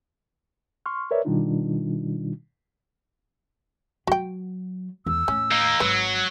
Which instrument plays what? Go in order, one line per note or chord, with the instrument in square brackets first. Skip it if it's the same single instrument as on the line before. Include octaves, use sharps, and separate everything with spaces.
[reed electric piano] C6 C#6 F6
A#4 B4 C#5 D5 E5
B2 D#3 G3 D4 D#4 F4
[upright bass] F#3 [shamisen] F#4 G5
[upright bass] E2 [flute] E6
[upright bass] A2 [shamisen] C#4
[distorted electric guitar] A#3 D#4
[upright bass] G#1 [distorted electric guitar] F#3 [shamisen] B4